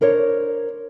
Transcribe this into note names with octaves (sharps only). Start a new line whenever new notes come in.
D4 A#4 C5 C#5